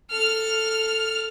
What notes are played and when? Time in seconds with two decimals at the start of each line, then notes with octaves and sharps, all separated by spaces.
0.11 A4 F6